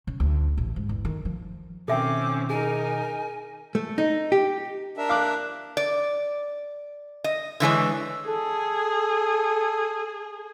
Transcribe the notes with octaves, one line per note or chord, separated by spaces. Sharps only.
C#3
D2
A1
G#2
E2
D#3
F3
B2 D#3 C4 C#4 A4 E5 G5 D6
D#4 G#4 A#4 G#5
A3
D#4
G4
D4 A#4 E5
F5 D6 F#6
D5
D#5
D3 E3 G#3 C#5
G#4 A4